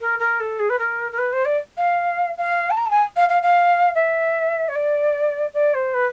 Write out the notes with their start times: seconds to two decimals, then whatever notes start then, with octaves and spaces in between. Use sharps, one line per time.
0.01 A#4
0.19 A#4
0.40 A4
0.59 G#4
0.69 B4
0.79 A#4
1.12 A#4
1.18 B4
1.32 C5
1.45 D5
1.77 F5
2.38 F5
2.70 A5
2.77 A#5
2.86 A5
2.90 G#5
3.16 F5
3.29 F5
3.43 F5
3.95 E5
4.68 C#5
4.75 D5
5.54 D5
5.74 C5
5.94 B4